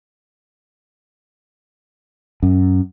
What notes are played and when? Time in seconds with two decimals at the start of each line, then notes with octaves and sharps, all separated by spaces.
2.43 F#2